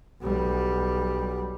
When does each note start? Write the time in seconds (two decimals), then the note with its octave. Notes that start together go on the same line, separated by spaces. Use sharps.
0.21 B1 G3